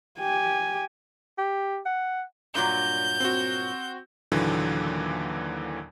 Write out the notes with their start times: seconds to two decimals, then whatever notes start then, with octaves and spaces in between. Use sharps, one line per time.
0.19 G4 G#5
1.38 G4
1.86 F#5
2.55 G2 A#2 F#3 G6
3.20 C4 F#4
4.32 D#2 A#2 D3 E3 F#3